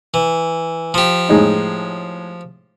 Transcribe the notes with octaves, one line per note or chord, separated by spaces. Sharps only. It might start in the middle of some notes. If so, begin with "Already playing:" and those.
E3
F3 G4
A2 G#3 D#4